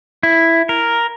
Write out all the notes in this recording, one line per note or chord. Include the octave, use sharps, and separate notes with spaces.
E4
A#4